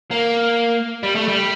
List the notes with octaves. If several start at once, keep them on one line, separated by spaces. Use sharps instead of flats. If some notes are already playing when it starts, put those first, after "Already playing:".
A#3
G3
A3
G3